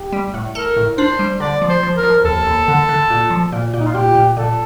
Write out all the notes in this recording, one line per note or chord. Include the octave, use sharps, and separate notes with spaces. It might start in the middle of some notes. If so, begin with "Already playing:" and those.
Already playing: G4
G3
A2
A4 A#4
A2
D4 C5
G3
D3 D5
F3
C5
F3
A#4
F3
D#2 A4
D#2
D3
D3
A#2
F3
A#2
A#2
D#4
F4
A#2 G4
A#2
A#2 A4